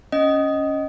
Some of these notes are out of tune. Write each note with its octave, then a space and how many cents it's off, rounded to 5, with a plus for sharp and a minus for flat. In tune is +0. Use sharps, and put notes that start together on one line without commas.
C#4 +0 D#5 +0